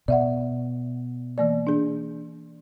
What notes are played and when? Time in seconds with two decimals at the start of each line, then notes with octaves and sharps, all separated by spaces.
0.08 B2 D5 E5 F#5
1.38 E3 A#3 D5
1.67 D4 G#4